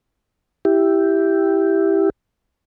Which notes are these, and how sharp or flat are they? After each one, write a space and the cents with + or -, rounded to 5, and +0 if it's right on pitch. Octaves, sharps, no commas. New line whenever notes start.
E4 +0 G4 +0